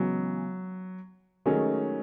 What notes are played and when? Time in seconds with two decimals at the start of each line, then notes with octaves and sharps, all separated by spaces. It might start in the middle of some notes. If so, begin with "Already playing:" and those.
Already playing: C#3 E3 F#3 G#3 B3
1.46 D#3 F#3 G#3 A3 C#4